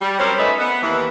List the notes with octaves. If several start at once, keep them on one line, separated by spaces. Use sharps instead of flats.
G3
F#3 G3 C4 C#4 A#4
A3 C#4 D#4 B4 E5
B3
D#2 E3